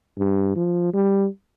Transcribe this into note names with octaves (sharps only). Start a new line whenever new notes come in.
G2
F3
G3